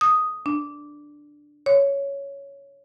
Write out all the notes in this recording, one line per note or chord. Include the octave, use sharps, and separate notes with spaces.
D#6
D4
C#5